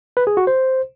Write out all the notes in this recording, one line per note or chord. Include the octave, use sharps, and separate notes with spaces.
B4
G#4
F#4
C5